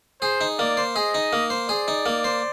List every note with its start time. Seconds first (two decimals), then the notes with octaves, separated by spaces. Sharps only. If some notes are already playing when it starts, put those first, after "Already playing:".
0.22 G#4 C5
0.41 D#4
0.59 A#3 D5
0.77 C5
0.96 G#4 D#5
1.14 D#4
1.33 A#3
1.50 C5
1.69 G#4 D5
1.88 D#4
2.06 A#3
2.24 C5